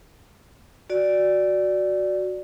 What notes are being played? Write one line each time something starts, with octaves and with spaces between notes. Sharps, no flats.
F#4 D5